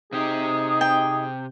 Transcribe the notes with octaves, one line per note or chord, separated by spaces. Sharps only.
C3 D#4 G4 G#4
G5